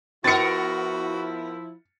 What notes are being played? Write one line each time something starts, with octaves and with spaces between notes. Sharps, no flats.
F3 B3 E4 F#4 A#4 A6 C#7